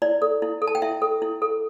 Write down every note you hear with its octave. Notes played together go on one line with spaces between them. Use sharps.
E4 D5
A4
E4
A4
A5
G5
E4 E5
A4
E4
A4